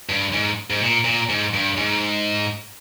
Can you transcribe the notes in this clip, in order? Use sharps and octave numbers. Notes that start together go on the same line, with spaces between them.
G2
G#2
G#2
A#2
A#2
G#2
G2
G#2